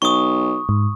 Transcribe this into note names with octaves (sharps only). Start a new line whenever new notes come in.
B1 C#6 D#6
G#2